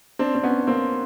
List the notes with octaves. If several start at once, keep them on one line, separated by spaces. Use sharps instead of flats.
C4 D4
C4
B3 C#4
A#3 C4